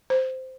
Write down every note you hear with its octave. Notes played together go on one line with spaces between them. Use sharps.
C5